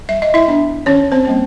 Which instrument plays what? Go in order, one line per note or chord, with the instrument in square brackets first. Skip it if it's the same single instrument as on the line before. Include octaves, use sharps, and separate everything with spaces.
[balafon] G3 E5
D#5
E4 E5
B3 D4
D#3 C#4 C#5
C4 C5
G3 A#3 C#4